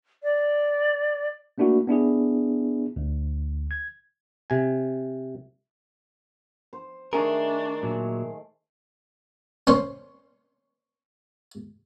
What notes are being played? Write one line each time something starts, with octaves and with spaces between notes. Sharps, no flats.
D5
A3 A#3 D4 E4 F#4
B3 D4 E4 G#4
D2
G#6
C3 G#5
C5
D#3 A3 D4 G#4 A#4
A#2 F#3
C#4 C5